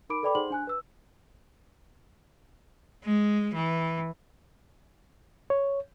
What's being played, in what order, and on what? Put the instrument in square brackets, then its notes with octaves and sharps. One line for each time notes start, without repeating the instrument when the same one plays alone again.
[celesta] D#4 A#4 B5 D6 D7
A4 B4 D5 G5 B5 D6
D#4 G#4 C5 F#5 C6 F#7
D4 G#5 F#6
B4 E6
[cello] G#3
E3
[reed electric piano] C#5